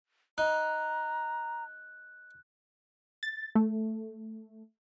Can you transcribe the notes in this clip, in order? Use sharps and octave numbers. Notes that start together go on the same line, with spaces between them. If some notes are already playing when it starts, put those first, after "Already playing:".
D#4 A#5 F#6
A6
A3